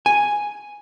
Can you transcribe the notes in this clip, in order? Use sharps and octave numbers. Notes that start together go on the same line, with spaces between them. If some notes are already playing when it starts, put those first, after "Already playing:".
G#5